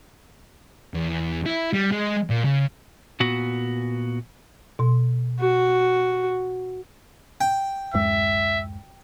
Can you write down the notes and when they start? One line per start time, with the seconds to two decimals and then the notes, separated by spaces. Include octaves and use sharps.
0.94 E2
1.46 E4
1.73 G3
1.92 G#3
2.30 A#2
2.45 C#3
3.20 A#2 B3 F#4
4.79 B2 C6
5.39 F#4
7.41 G5
7.94 D1 F#2 G#3 E5